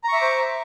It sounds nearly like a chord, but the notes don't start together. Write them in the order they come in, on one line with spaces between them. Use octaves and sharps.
A#5 C#6 E5 D6 C5